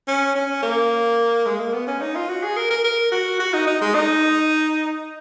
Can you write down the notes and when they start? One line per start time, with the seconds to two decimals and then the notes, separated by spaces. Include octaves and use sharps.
0.08 C#4
0.35 C#4
0.63 A#3
1.46 G#3
1.60 A#3
1.74 B3
1.88 C#4
2.01 D#4
2.15 F4
2.29 F#4
2.43 G#4
2.57 A#4
2.70 A#4
2.84 A#4
3.12 F#4
3.40 F#4
3.54 D#4
3.67 D#4
3.81 G#3
3.95 D#4